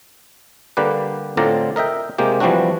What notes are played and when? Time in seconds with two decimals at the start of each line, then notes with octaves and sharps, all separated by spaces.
0.77 D3 G3 A#3 G4 B4
1.37 A2 D3 C4 F4 D5 A#5
1.76 A#4 D#5 E5 G5
2.18 C3 G#3 A#3 G4
2.40 E3 F3 G3 C4 D4 F#4